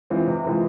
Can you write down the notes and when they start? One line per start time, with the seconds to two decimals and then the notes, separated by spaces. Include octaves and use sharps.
0.10 E3 G#3 C4 F4
0.27 C3
0.44 E3 G#3 C4 F4